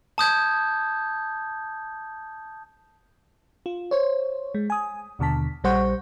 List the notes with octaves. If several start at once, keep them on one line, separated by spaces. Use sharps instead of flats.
A5 D#6 G6 G#6
F4
C5 C#5
G#3
G#5 D#6
D#2 B2 D3 A5 B6
A#1 G3 C5 F#5 C#6 G6